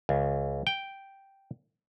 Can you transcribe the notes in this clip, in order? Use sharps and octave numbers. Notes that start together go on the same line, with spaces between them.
C#2
G5